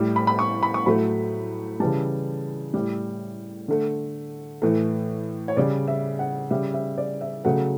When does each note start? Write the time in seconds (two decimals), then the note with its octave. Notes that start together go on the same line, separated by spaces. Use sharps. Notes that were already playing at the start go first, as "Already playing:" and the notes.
Already playing: A2 G3
0.16 B5
0.27 B5
0.39 C#6
0.63 B5
0.74 C#6
0.86 A2 F#3 A3 B5
1.80 C#3 E3 G3 A5
2.74 A2 G3
3.68 D3 A3
4.62 A2 E3 A3
5.48 C#5
5.57 C#3 G3 D5
5.88 E5
6.19 F#5
6.51 C#3 G3 E5
6.74 E5
6.98 D5
7.21 E5
7.45 C#3 F#3 A3 F#5